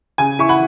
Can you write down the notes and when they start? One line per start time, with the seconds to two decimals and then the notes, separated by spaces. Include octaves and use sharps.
0.18 C#3 G#5
0.39 E4 C#6
0.49 F#5 B5